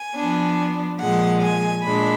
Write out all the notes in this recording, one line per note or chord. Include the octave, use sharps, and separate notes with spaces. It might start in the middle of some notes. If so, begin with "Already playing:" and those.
Already playing: G#5
F3 B3 D4
A#2 F3 G#3 F#5
G#5
A#2 G#3 D4 B5